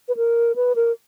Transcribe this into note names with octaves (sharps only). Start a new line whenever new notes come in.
B4
A#4
B4
A#4